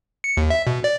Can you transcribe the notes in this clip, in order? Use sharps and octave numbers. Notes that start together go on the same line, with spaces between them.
C#7
D#2
E5
B2
D5